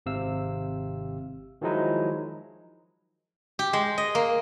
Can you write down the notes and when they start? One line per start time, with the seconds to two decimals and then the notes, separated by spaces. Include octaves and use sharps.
0.06 G#1 C3 F5 E6
1.62 D#3 F3 F#3 G#3 D#4 E4
3.59 G4
3.73 G#3
3.98 D#5
4.15 A#3